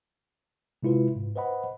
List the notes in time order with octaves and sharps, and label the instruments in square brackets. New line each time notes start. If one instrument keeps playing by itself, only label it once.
[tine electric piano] C3 G#3 E4 F4 B4
G#2
B4 C5 D#5 F#5 B5